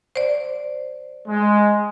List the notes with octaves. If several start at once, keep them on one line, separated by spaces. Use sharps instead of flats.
C5 D5
G#3